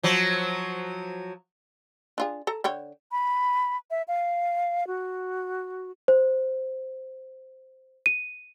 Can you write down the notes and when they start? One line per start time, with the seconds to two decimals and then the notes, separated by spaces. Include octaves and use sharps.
0.03 F3 F#3
2.18 D4 F4 G#4
2.47 A4 A#5
2.64 D3 C#5 G5
3.12 B5
3.91 E5
4.08 F5
4.87 F#4
6.08 C5
8.06 D#7